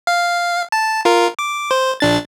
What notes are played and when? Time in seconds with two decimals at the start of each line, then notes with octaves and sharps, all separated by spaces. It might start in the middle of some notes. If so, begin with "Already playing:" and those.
0.07 F5
0.72 A5
1.05 F4 A#4
1.39 D6
1.71 C5
2.00 A#1 D4 A6